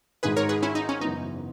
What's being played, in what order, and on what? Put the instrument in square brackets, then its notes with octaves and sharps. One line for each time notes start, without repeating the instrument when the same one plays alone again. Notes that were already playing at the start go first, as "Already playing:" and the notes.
[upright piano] G#1 G#2 D#3 G#3 [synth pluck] G#4 B4
[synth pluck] A#4 C#5
G#4 B4
C#4 E4
D#4
C#4
[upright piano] F#1 F#2 E3 B3 [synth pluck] D#4